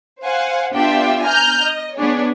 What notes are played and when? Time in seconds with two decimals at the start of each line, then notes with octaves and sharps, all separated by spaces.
0.23 C5 F5 F#5 G#5
0.74 B3 D4 F4 G4 E5 G5
1.23 G#5 A#5 F6 G6
1.63 D#5
1.97 B3 D4 G#4 C#5